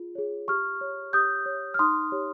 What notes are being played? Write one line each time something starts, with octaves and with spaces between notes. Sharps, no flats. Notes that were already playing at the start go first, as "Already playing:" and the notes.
Already playing: F4 G#4
G#4 C#5
G4 C#6 F6
C#5
G4 D#6 G6
C#5
F6
D#4 C6 D#6
G4 C#5